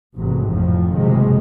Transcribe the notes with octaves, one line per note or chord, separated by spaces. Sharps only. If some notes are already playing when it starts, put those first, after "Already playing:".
A1 G#2 C3 F#3
F1 F2 A2 F3
F#1 A2 C3 D#3 G#3